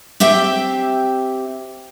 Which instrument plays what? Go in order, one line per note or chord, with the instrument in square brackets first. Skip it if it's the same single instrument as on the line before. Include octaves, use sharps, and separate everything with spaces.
[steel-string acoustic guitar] C4 G4 E5 G5